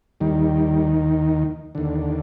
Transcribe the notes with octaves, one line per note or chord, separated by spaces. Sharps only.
D#2 D#3 G3
D#2 D3